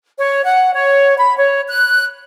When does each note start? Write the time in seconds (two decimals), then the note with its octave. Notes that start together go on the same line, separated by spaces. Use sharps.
0.17 C#5
0.45 F#5
0.73 C#5
1.18 B5
1.37 C#5
1.69 F#6